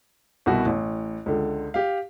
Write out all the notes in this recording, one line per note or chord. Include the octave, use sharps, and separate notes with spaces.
C2 B2 F#4
A1
C#2 D3
G4 F5